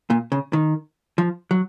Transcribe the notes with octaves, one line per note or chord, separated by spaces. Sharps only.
A#2
C#3
D#3
F3
F#3